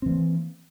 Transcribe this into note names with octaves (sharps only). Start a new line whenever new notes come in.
E3 A#3 C4